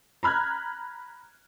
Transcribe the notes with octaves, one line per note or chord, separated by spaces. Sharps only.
A#5 B5 F6 F#6 G#6